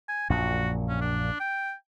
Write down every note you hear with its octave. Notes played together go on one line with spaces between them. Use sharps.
G#5
A#1 F#2 A#2 F#4
C#4
D4
G5